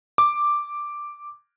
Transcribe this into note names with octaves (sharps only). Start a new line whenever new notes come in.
D6